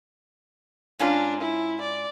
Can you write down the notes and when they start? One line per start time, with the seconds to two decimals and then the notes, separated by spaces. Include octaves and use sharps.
0.99 G#2 C#4 D4 F4
1.40 E4
1.81 D5